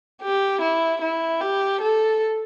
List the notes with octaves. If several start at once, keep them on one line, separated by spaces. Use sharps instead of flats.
G4
E4
E4
G4
A4